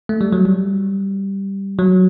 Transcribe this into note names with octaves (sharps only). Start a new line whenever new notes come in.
A3
G3
F#3
G3
F#3